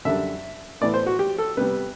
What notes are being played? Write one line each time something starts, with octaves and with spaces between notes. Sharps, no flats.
F#2 D3 G3 D4 E5
A2 E3 B3 E4 D5
C5
F#4
G4
A4
C3 G3 B3 B4